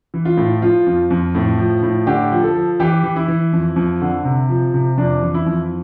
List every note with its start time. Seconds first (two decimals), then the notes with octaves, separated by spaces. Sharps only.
0.14 E3
0.25 F4
0.37 A2
0.61 F3 F4
0.86 F2
1.10 F2
1.35 A2
1.58 F3
1.82 A2
2.07 D3 G4
2.32 F3
2.43 A4
2.56 F3
2.80 E3 G4
3.04 E3
3.16 E4
3.28 E3
3.53 F2
3.76 F2
4.01 D3
4.24 C3
4.49 F3
4.74 C3
4.97 F2 D4
5.22 E3
5.34 E4
5.46 F2